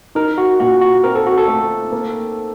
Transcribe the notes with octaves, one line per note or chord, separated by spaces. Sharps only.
D#4 A#4
F#4
A#2 F#4
F#4
C4 A#4
A4
F#4
A4
A3
A#3